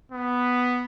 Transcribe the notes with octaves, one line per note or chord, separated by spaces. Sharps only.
B3